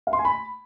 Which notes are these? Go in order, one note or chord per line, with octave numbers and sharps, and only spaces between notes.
F5
C6
G#5
B5